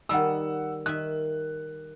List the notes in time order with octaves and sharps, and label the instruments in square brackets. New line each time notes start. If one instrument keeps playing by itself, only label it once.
[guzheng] D#3 G3 D#4 [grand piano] F#5 E6
[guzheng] D#3 E5 [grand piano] F#6